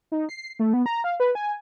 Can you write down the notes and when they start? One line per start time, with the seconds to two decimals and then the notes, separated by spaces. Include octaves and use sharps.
0.12 D#4
0.29 C7
0.59 A3
0.73 B3
0.86 A#5
1.04 F5
1.20 B4
1.35 G#5